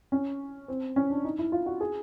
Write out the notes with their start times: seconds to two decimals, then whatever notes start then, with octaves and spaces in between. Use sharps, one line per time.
0.12 C#4
0.68 C4
0.96 C#4
1.10 D4
1.24 D#4
1.39 E4
1.52 F4
1.66 F#4
1.81 G#4